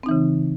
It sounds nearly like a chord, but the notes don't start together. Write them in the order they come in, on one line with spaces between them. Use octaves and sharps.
C4 D#4 E3 C#3